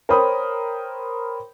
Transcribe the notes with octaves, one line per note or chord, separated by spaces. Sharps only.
A#4 C5 C#5 G5 B5 D#6